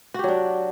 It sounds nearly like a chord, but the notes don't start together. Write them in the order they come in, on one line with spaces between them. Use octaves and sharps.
F#4 G4 F#3 D4